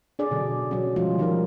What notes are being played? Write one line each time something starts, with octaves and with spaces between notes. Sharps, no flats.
D4 G#4 D5
B2 D3 F#3
F#3 C#4
F3 G3 G#3 F4
D#3 F3 D#4 A#4